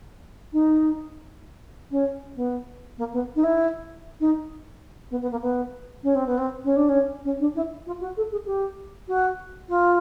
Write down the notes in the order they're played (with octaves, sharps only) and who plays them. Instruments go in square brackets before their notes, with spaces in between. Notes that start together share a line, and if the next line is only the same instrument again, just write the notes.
[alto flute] D#4
C#4
B3
A#3
B3
D#4
E4
D#4
B3
B3
A#3
B3
C#4
C4
B3
C4
C#4
D4
C#4
C#4
D4
E4
F4
F#4
A4
G#4
G4
F#4
F4